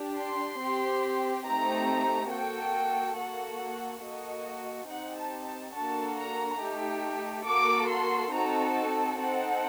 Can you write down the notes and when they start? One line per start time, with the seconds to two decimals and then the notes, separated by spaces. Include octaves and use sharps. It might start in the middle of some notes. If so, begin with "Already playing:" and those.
Already playing: D4 G4
0.17 C6
0.61 C4 G4
1.46 A3 C4 D#4 G4 A#5
2.31 A#3 F#4 A4 G5
3.17 A#3 F#4 A4 F#5
4.03 A#3 F#4 A4 D#5
4.89 C4 D#4 G4 F#5
5.18 A5
5.46 A5
5.74 A#3 D4 F#4 A4 A5
6.18 A#5
6.61 A3 D#4 G4
7.46 A#3 F#4 A4 D6
7.90 C6
8.32 C4 D#4 F#4 A4 A#5
8.75 A5
9.18 C4 D#4 A4 F#5